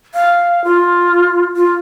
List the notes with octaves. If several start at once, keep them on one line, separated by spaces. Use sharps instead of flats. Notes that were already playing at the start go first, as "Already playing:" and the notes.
F5
F4
F4